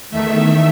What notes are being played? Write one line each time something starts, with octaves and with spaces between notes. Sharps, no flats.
E2 D#3 A3 E5